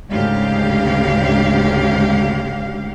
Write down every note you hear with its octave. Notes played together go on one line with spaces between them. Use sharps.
D2 G#2 C#3 G#3 G4 F5